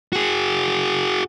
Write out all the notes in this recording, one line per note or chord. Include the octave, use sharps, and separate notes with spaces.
F#4 G#4